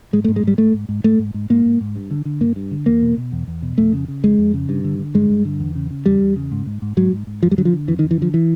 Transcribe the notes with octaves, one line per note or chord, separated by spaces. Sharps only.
G#2 G#3
A3
G#2
G#3
G#2 G3
G#2 A3
G#2
G#2
G#2 A3
G#2
G#2
G#2 A#3
G#2
G#2
G2
D3
D3
G2 A#3
G2
D3
E2 A#3
B2
B2
E2
E2
B2
F2 A3
C#3
C#3
F2 G#3
F2
C#3
G2
D3
D3
G2 G#3
G2
D3
E2
C#3
C#3
E2 G3
E2
C#3
G#2
G#2
G#2
G#2 F#3
G#2
G#2
F2 F3
G3
D3 F#3
F3
D3
F2 E3
D#3
F2
E3
D3 F3
E3